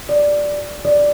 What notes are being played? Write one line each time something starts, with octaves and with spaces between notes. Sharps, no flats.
D5
D5